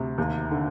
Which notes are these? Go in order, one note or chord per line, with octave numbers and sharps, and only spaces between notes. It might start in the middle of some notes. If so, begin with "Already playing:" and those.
Already playing: D2 C3
D#2
D3